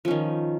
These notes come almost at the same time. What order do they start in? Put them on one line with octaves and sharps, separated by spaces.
F3 C#4 D#3